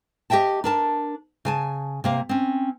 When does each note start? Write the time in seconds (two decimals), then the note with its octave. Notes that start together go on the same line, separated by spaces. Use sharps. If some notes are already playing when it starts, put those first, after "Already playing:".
0.30 G4 D#5 E5 G5 A5
0.64 D4 A#4 A5
1.45 C#3 G#5 A5
2.04 C3 A#3 F5
2.29 C4 C#4